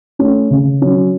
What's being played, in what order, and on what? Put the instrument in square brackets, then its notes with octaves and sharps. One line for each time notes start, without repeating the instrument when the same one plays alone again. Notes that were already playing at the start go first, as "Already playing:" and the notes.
[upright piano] A3 C#4
C#3
F#3 C#4